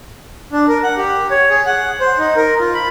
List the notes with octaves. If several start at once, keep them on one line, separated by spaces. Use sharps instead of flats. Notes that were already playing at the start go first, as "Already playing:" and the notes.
D4
A#4
F#5
G4
C#5
G#4
F#5
C5
D#4
A#4
F4
B5